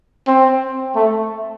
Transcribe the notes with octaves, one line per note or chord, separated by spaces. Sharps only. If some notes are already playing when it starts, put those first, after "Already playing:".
C4
A3